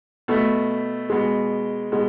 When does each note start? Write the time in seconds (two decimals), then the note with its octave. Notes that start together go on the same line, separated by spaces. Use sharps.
0.28 B2 A3
1.10 B2 G#3
1.92 B2 G#3